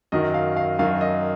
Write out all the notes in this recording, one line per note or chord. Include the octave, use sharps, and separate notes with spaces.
F#2 D#3 F#3 D#5
F5
F5
F#2 D#3 F#3 F5
D#5